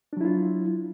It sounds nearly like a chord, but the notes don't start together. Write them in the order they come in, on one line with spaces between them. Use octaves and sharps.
D4 F#3 E4 F4